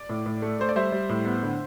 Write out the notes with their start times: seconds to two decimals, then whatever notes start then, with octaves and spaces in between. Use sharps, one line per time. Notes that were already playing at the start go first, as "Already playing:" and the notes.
Already playing: D5
0.09 A2
0.26 A2
0.42 A3
0.59 A3 C5
0.69 D5
0.76 G3 C5 E5
0.92 G3
1.09 A2
1.25 B3
1.43 D3